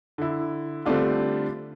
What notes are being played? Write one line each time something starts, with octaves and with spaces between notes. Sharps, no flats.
D3 E4
D3 G3 A3 C4 D4 F4